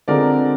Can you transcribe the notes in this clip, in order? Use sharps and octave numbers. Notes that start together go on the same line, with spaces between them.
D3 F3 G#3 C4 A#4 D5